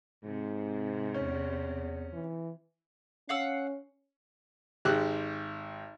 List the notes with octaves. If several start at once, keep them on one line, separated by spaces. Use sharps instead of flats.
G#2 C3
E2 C#4
E3
C#4 F5 F#5 E6
G#1 G#3 G4 F#6